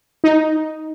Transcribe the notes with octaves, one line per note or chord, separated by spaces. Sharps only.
D#4